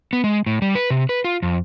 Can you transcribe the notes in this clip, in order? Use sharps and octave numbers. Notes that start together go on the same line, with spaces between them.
B3
G#3
A2
G3
B4
C3
B4
F4
F2